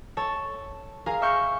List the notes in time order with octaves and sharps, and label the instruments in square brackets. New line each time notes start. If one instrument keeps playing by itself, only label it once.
[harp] A4 C#5 A5
G#4 A#4 F5 A#5
E5 C#6 F6 G6 C#7